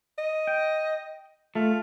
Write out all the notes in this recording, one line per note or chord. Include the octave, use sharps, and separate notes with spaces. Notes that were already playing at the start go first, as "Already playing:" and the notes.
D#5
G5
A3 F4